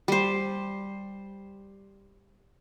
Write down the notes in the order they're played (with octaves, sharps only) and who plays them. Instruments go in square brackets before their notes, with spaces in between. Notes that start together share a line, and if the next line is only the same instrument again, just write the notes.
[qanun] G3 C5